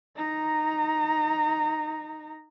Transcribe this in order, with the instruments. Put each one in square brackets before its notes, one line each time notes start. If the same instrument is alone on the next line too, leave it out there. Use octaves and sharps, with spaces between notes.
[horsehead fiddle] D#4 A#5